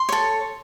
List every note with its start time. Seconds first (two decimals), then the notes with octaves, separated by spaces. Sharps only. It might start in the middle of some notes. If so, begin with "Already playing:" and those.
Already playing: C6
0.09 A4 C#5